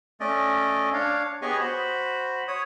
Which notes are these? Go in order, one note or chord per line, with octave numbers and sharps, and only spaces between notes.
A3 C#4 D5 D#5
D4 C#5 F5
B3 G4 G#4 C#5 D#5 G#5
F#4 C5 B5
C#5 D#6